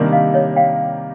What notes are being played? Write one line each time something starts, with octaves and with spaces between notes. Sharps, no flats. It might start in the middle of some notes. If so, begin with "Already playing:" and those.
Already playing: C3 D#3 G3 A#3 D4
D#5 F5
C#5 D#5
F5 G5